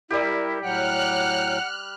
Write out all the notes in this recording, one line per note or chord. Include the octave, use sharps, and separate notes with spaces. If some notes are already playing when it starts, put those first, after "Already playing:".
G3 E4 G4 A#4
A2 F#3 F#5 G5 F6 F#6